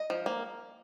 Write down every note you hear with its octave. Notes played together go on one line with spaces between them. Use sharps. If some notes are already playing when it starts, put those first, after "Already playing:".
Already playing: D#5
F3
A#3